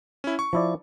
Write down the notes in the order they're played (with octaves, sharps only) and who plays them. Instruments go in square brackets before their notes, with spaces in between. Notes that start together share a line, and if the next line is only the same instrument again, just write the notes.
[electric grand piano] C#4 E4
C#6
[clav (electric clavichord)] F3 E4 D5